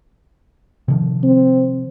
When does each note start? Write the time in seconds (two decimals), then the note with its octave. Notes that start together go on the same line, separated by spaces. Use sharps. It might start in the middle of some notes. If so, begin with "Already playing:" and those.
0.88 C3 D#3 F3
1.23 C4